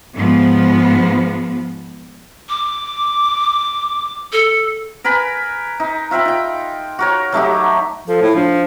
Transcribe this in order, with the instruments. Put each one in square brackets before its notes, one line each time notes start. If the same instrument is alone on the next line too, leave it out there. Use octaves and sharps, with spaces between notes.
[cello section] G#2 F3 B3
[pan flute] D6
A4
[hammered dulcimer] A#4 B4 G#5 B5
D#4
F4 E5 G5 B5
D#4 G5
F#4 A#4 C#5
F#3 A3 D#4 G4
[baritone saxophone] F3 [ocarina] A4
[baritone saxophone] A2
[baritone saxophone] F3 [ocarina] D4